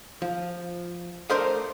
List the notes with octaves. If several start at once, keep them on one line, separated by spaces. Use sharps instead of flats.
F3
A3 D4 A#4 C5 D#5 F5